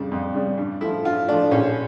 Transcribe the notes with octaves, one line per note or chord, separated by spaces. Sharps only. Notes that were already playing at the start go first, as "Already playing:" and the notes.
Already playing: F2 C#3 G3 D4
F2
C#3 G3
G2
F3 A3 E4
G2 F4
F3 A3 D4
A#1 C#4